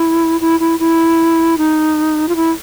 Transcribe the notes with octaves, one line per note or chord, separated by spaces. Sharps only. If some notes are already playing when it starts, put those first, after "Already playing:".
Already playing: E4
E4
E4
E4
D#4
F4
E4